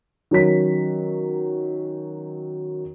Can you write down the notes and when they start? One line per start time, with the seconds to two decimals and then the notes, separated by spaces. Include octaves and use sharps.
0.31 D#3 F#3 C#4 B6